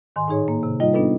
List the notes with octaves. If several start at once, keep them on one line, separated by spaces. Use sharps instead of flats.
G#2 D#3 G#5 C6
A2 D#4 G#4 C#5
A#3
C3
G3 D#4 F4 D#5
B3 D4 D#4 F4 A4 B4